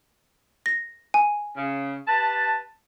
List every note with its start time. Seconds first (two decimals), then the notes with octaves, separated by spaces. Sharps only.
0.66 A#6
1.14 G#5
1.57 C#3
2.08 G4 B4 A5